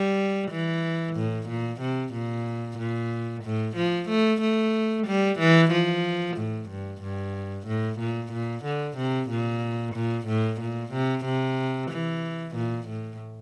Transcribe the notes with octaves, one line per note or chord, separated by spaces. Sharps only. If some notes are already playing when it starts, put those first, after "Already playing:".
Already playing: G3
E3
A2
A#2
C3
A#2
A#2
A2
F3
A3
A3
G3
E3
F3
A2
G2
G2
A2
A#2
A#2
D3
C3
A#2
A#2
A2
A#2
C3
C3
E3
A#2
A2